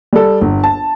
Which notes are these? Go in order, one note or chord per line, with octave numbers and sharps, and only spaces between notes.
G3 A4
G1
A5